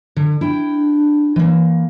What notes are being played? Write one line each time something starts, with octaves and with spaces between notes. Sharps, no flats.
D3
D4 E4 G5
E3 A#3